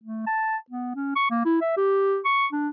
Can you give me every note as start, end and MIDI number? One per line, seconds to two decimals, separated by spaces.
0.04 0.26 57
0.27 0.57 81
0.70 0.92 59
0.95 1.13 61
1.16 1.29 85
1.31 1.45 58
1.45 1.59 64
1.61 1.76 76
1.77 2.19 67
2.25 2.47 85
2.52 2.69 62